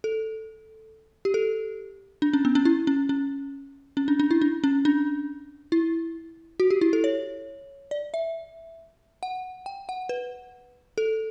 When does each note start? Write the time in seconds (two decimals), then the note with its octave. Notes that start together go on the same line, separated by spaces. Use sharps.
0.04 A4
1.25 G4
1.34 A4
2.22 D4
2.33 C#4
2.45 B3
2.55 C#4
2.65 E4
2.87 C#4
3.09 C#4
3.97 C#4
4.08 D4
4.20 D4
4.31 E4
4.42 D4
4.64 C#4
4.85 D4
5.72 E4
6.60 F#4
6.70 G4
6.81 E4
6.93 A4
7.04 C#5
7.91 D5
8.14 E5
9.23 F#5
9.66 G5
9.89 F#5
10.09 B4
10.98 A4